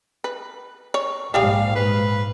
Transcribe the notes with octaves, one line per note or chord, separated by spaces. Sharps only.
B4
C#5
A#1 G#2 G3 G#4 F5 G5
B4